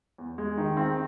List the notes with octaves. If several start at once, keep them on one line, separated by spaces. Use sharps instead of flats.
E2
G#3
D#3
C4